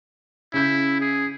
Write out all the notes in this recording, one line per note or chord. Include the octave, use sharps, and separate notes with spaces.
C#3 E4 G6
G#4